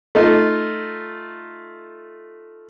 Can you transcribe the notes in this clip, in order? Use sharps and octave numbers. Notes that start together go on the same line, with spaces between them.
A3 D#4 F4